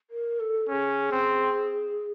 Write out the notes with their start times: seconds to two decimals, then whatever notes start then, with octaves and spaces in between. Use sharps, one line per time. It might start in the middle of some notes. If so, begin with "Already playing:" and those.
0.10 A#4
0.40 A4
0.68 C#4 G#4 A4
1.12 C4